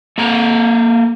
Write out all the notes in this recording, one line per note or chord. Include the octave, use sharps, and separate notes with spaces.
A#3 A4 A#5